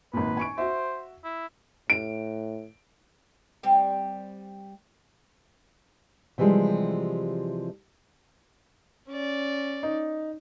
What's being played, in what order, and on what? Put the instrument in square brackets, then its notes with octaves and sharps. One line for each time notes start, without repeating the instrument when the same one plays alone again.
[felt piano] G#1 A#2 [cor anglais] B4
[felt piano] G#5 C#6 D7
[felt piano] F#4 E5 [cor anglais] C5
[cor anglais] E4
[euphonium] A2 [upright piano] D7
[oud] G3 C4 G4
[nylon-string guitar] C3 E3 F3 G3 G#3
[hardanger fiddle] C#4 D5
[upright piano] D#4